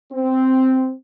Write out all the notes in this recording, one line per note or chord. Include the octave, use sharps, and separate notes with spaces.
C4